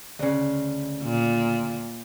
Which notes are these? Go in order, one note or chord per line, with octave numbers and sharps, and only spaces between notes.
D2 C#3
A#2